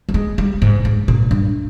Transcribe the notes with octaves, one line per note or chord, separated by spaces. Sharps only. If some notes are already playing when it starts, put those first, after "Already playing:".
G3
G#3
G3
G#2
G#2
A#2
G2